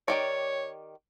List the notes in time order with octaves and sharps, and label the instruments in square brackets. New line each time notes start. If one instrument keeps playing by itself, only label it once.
[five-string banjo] D#3 G4 D5 [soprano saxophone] C#5